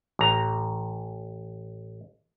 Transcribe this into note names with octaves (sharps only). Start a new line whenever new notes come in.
A1 A#5